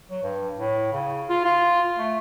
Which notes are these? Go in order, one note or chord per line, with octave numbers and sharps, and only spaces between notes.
F#3
G2
A2
C#3
F4
F4
A3